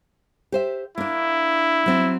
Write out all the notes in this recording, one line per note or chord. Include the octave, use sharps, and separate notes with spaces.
G4 C5 E5
A#3 D4 E4
F#3 C4